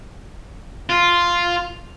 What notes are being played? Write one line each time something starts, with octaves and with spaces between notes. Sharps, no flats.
F4